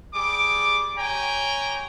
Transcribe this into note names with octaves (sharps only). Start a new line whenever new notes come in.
G3 G#4 D6
G4 C#5 G5 G#5 A#5